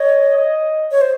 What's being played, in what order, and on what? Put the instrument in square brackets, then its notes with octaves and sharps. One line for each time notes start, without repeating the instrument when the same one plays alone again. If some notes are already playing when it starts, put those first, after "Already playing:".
Already playing: [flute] C#5 [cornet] D#5
[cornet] D#5
[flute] C#5
C5